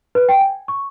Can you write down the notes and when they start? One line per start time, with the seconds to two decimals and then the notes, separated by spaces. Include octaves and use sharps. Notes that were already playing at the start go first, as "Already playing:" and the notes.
0.15 B4
0.29 G5
0.41 G#5
0.68 C#6